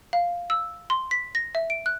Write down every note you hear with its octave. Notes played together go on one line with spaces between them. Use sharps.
F5
E6
C6
B6
A#6
E5
D7
F#6